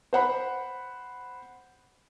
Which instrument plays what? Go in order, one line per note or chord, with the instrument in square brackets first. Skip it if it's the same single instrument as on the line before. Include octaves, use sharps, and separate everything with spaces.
[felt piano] C5 F#5 B5